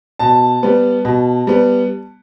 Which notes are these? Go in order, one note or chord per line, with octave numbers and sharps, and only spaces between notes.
B2 A5
G3 B3
B2
G3 B3